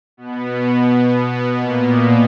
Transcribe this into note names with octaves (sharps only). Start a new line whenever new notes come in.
B2 B3
A#2 A#3